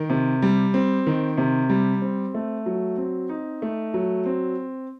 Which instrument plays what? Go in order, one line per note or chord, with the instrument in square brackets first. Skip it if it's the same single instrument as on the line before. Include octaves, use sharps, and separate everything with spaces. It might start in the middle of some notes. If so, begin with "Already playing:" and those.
Already playing: [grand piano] D#3
C3
G3
C4
D#3
C3
G3
C4
A3
F#3
C4
D#4
A3
F#3
C4